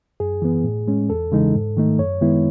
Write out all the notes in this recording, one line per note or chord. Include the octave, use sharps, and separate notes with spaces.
F#2 G#4
E3 B3
A2
G#3 C#4
E2 A4
C#3 E3 G#3 D#4
G#2
D#3 A3 D#4
F#2 C#5
D#3 G#3 B3 E4